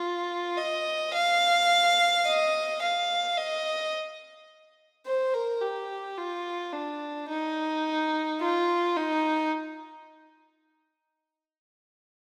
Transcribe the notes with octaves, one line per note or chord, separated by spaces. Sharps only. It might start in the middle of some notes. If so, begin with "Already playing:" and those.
Already playing: F4
D#5
F5
D#5
F5
D#5
C5
A#4
G4
F4
D4
D#4
F4
D#4